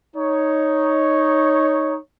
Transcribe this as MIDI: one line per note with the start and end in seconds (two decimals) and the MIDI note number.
0.16 1.98 63
0.16 1.98 73